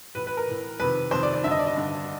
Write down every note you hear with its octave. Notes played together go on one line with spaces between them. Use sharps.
A2 E3 B4
B4
A#4
A2 E3
F2 C3 D#3 B4
F2 C3 D#3 C5
D5
D5
G2 D3 E5
D#5
D5
D#5
G2 D3